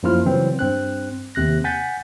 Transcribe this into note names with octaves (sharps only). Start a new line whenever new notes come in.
F#2 F3 A#3 E4 F4 F6
C#3 E3 F#3 G3 C4
G2 C4 F#6
D#2 C3 F#6 A#6
F#5 G#5 G6 A6 B6